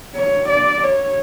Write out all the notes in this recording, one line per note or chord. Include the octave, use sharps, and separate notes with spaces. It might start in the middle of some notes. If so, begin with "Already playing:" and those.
C#5
D5
C#5